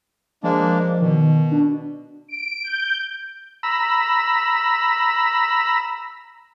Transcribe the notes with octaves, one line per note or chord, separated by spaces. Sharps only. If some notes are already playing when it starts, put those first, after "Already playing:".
F3 G#3 A#3 D4
B2 D#3
D4
D7
G6
A#5 B5 E6